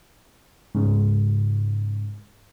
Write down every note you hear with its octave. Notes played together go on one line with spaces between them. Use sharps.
G#2 C#3